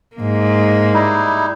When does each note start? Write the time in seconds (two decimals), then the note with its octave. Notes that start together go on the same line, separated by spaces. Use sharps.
0.16 G#2 A#3
0.94 G3 D#4 E4